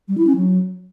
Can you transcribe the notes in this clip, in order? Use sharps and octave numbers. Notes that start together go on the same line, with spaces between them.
G3
E4
C#4
F#3